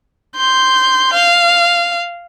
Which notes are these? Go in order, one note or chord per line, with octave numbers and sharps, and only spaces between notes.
C6 G6
F5